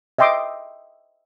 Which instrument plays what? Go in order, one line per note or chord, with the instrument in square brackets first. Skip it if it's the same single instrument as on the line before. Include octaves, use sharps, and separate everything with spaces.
[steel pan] D#5 E5 G5 C6 D6 D#6